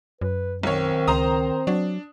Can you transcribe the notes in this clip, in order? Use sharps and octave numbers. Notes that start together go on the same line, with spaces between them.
F#2 B4
B1 D#3 C4 C#5
C#2 C5 A#5 D#6
F#3 D4